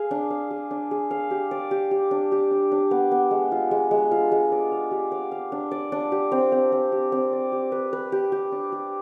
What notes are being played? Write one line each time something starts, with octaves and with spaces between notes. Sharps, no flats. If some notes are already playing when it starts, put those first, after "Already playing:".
Already playing: G#4 F5
D4
F5
G#4
D4
G#4
F5
G4
D5
G4
G4
D4
G4
D4
D4
B3
B3
G#3
F4
G#3
G#3
F4
G#3
D5
F5
G4
D5
F5
D4
D5
D4
G4
C4
C4
C4
G4
C4
D5
G4
B4
B4
G4
G4
D4
G4